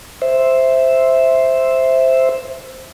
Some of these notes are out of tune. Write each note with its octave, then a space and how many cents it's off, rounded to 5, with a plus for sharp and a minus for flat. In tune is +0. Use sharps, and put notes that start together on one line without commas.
C5 +0 E5 +0